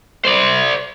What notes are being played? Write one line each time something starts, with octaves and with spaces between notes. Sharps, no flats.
C5 D5